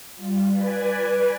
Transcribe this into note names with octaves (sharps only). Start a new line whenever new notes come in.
G3 F4
B4 D5 G#5